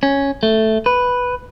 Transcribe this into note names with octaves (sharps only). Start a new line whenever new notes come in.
C#4
A3
B4